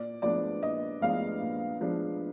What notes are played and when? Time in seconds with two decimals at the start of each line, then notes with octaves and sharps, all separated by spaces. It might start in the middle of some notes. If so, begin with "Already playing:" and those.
Already playing: A#2 D5
0.22 F3 G#3 B3 D4 D5
0.62 A#2 D#5
1.01 F3 G#3 B3 D4 F5
1.41 A#2
1.81 F3 G#3 B3 D4